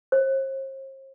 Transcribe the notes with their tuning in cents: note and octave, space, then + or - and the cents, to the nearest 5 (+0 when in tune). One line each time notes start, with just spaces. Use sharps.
C5 +45